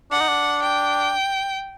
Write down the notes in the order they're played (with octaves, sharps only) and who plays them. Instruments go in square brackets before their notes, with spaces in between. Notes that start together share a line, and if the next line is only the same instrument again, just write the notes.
[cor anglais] D4 [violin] F#5
[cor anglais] D#4
D4
[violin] G5